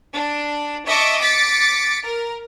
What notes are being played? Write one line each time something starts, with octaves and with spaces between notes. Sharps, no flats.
D4
D#5 E5 A5 C#6 D6
D6 A6 B6 C#7
A#4